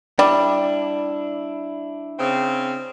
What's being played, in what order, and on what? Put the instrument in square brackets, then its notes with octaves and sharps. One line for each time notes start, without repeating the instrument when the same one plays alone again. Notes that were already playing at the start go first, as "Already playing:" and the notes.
[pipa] G3 [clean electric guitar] D4 E4
[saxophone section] C#3 C4